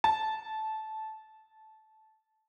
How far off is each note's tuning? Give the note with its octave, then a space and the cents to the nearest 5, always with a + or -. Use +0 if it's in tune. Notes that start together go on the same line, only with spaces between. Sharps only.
A5 -15